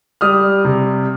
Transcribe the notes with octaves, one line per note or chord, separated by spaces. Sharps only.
G3 D#6 F6
C3